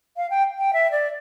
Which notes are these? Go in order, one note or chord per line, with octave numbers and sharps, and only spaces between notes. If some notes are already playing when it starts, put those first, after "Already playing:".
F5
G5
G5
E5
D5